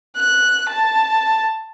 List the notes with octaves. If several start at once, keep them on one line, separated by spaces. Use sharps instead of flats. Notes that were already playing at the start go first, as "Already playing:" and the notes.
F#6
A5